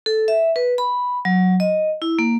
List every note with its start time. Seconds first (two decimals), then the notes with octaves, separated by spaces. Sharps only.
0.06 A4
0.28 E5
0.56 B4
0.78 B5
1.25 F#3
1.60 D#5
2.02 E4
2.19 A#3